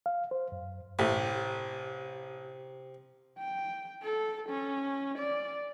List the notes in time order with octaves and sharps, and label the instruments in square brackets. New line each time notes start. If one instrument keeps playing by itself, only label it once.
[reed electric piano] F5
C5
F#2
[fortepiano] A1 G4 [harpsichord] C3
[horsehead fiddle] G5
A4
C#4
D5